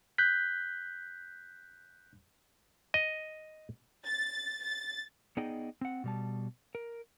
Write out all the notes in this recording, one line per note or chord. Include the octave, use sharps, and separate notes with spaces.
F#6 G6 B6
D#5
A6
A6
B3 D#4 G#4 D5 D#5 G5
C4 F#5
B2 G3 A5
A#4